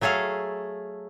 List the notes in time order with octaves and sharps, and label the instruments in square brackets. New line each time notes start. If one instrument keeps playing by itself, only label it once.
[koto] F#3 A3 G#4 A4 F5